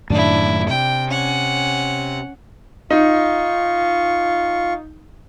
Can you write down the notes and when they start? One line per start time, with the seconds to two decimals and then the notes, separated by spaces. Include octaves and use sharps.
0.10 F#2 A2 D#3 D4 E4
0.69 C3 G5
1.08 C#4 F#5
2.90 D#4 F4 C#6